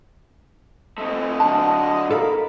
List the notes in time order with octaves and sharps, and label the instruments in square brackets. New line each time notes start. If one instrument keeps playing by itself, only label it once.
[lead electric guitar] A3 C4 [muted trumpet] D#5
[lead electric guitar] D3 F#3 [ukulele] A5
[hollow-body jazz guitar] A4 A#4 F5 [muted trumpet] B5